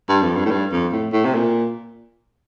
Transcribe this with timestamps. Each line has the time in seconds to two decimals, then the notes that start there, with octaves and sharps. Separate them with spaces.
0.09 G2
0.22 F2
0.36 G2
0.45 A2
0.51 G2
0.72 F2
0.92 A2
1.13 A2
1.25 C3
1.35 A#2